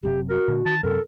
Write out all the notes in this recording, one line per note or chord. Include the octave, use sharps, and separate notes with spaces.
F#1 F#2 C3 G4
F#4 A#4
A#2 D3
D#3 A5
F#2 C3 A4 A#4